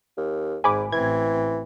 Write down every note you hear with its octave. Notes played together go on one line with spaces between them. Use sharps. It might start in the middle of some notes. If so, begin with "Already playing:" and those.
D#2
G#1 G#2 G#5 B5 D6
A1 E3 C4 G#6